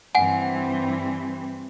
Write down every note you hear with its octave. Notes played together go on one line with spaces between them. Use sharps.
G2 E3 C4 F#5 G#5